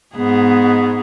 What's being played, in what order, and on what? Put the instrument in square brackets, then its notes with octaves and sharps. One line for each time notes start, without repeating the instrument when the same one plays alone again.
[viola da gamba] G#2 B3 G#4